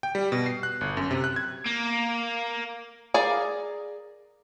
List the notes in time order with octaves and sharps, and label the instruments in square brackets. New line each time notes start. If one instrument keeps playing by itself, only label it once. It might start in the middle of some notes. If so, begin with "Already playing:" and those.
[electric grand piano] G5
G3
B2
C7
F#6
G1
F#2
C3
F#6
G#6
[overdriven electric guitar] A#3
[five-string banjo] G#4 A#4 D5 F5